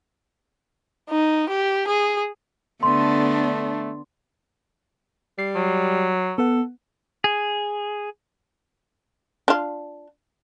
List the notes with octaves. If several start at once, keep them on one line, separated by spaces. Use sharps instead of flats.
D#4
G4
G#4
D3 A3 B3 D4 C6
G3 C7
F#3
B3 A4 F#5
G#4
D4 F4